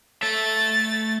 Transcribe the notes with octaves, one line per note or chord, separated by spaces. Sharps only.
A3 E5 A6